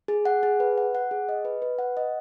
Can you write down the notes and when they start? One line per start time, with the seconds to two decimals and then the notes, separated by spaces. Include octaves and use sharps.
0.08 G#4
0.25 F#5
0.43 G#4
0.60 B4
0.78 F#5
0.95 F#5
1.11 G#4
1.29 D#5
1.45 B4
1.62 B4
1.78 F#5
1.97 D#5